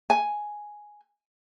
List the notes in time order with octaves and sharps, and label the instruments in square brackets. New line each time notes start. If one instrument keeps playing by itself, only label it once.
[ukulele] G#5